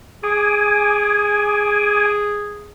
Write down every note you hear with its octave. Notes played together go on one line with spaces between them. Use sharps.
G#4 G#5 D6 D#6